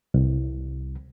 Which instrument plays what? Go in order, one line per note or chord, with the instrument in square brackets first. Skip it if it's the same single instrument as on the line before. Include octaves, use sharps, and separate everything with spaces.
[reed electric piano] C2